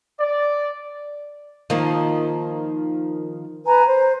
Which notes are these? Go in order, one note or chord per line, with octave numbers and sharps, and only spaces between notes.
D5
D#3 F3 A#3
B4 G#5 A#5
C5